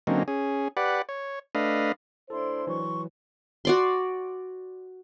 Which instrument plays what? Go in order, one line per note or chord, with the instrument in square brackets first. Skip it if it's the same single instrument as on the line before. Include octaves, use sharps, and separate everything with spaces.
[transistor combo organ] D3 F#3 A#3 C4 C#4 D#4
C#4 G#4
G4 B4 D5 F#5
C#5
A3 D4 B4 D#5 F5
[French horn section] A2 D4 C5 [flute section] E4 D5 C6 [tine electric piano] A4
[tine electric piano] E3 F#3 [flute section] C6 C#6
[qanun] F#4 D5 C6